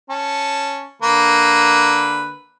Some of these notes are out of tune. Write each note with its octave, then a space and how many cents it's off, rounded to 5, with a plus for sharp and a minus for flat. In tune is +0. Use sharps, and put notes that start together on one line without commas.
C#4 -5 A5 +0
D3 +0 A#3 +0 B4 +0